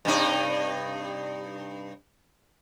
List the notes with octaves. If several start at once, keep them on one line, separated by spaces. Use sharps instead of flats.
G2 C3 D#4